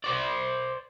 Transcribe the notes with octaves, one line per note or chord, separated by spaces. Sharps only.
C5 D5